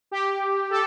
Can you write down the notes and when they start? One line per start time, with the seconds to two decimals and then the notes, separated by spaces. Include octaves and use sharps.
0.11 G4
0.70 A4